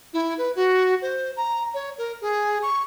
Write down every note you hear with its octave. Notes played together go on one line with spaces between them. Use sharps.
E4
B4
F#4
C5
A#5
C#5
A#4
G#4
C#6